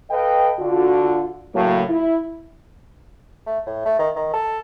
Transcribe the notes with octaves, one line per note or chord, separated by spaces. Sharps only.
A4 B4 D#5 F5 G5
D3 F4 F#4
A2 C#3 F#3 A#3
E4
A3
A2
A3
D#3
D#3
A4